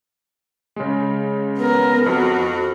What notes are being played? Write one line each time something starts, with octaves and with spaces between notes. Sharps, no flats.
C#3 G#3
B3 A#4
F2 F#4